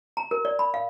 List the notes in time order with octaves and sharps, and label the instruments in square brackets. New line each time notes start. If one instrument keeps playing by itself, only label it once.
[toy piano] A#5
A#4
D5
B5
F5